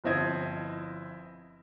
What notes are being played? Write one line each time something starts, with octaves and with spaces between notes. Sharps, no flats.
G1 F3 C4 E4 D#5 G#6